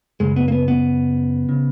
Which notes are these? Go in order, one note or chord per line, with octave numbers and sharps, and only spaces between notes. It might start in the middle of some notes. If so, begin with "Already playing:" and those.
F#2 C#3 G#3
B3
A#3
B3
B3
C#3